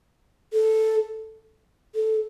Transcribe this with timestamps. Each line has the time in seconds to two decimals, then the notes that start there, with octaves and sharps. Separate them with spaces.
0.53 A4
1.95 A4